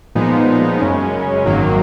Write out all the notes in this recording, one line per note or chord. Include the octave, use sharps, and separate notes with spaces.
A#2 F3 G#3 B3 D#4
F#2 C#3 G#3 C#4
G#1 F#2 D#3 F#3 A#3